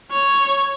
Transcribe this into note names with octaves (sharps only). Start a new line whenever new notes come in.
C#5